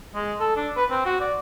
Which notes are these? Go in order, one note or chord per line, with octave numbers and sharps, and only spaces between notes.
G#3
A4
D4
B4
C4
F#4
D5